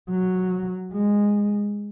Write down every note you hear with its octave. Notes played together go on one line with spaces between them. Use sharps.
F#3
G#3